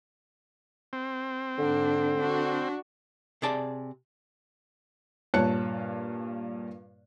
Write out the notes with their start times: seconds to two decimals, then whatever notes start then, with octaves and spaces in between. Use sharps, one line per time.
0.93 C4
1.58 G#2 D3 D4
2.18 D4 F#4
3.42 C3 G#4 D5 A5
5.34 G2 A#2 C#5 A5 F#6 C#7